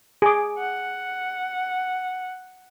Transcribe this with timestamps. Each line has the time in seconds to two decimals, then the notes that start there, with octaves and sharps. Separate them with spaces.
0.22 G#4 D6
0.59 F#5